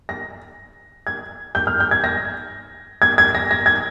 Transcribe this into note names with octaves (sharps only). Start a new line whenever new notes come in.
A#6
G#6
G6
F6
G6
G#6
A#6
G#6
G#6
A#6
A#6
G#6